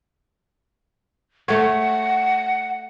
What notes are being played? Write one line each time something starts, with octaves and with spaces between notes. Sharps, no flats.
A3 C#5 F#5